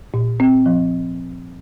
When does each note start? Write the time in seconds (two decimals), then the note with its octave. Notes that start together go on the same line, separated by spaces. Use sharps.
0.14 A#2
0.40 C4
0.66 F3